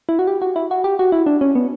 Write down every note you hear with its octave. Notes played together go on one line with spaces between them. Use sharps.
E4
F#4
G4
F#4
E4
F#4
G4
F#4
E4
D4
C#4
B3